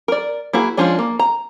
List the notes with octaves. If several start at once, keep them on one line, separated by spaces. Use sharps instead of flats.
A#4 D5
A#3 E4 F#4 G#4
F3 G#3 C#4 D4
A#3
A#5